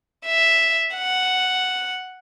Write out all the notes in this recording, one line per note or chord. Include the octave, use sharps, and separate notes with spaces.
E5
F#5